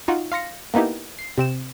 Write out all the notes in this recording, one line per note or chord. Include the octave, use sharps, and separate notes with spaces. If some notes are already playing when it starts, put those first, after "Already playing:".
D#4 F4 F#4
F5 C6 A#6 C#7
A#3 B3 D#4 E4 G4
C7
C3 C4 E7